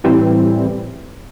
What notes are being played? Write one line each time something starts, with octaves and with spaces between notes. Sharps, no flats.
A2 E3 G3 C4